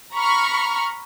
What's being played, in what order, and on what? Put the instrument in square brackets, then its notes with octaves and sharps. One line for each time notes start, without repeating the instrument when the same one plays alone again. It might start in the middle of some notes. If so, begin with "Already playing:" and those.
[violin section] A#5 B5 C#6 F6